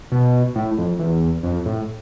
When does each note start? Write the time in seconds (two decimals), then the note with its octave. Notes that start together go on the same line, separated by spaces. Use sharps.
0.12 B2
0.56 A2
0.78 F2
0.99 E2
1.43 F2
1.66 A2